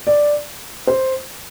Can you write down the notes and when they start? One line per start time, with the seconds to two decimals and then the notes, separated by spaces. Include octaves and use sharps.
0.07 D5
0.87 C5